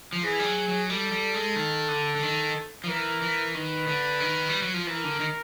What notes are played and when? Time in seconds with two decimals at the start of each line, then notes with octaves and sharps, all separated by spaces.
0.13 F3
0.23 E3 G#4
0.39 G3
0.46 F#3
0.68 F#3
0.90 G3 A4
1.12 G3
1.34 G#3
1.56 D#3
1.88 D3
2.16 D3
2.23 D#3
2.84 F3
2.88 E3 A#4
3.22 E3
3.54 D#3 B4
3.88 D3
4.20 D#3
4.49 G3
4.62 F#3
4.74 F3
4.87 E3 A#4
5.04 D3
5.20 D#3